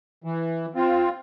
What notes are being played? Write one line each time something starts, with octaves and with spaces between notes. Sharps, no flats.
E3
C4 F4